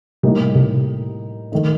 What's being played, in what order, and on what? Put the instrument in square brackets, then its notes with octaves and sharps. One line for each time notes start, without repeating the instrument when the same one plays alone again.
[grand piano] A2 G3 A#3 D#4 [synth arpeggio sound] C3
[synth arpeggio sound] C3
[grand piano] D#3 A3 D#4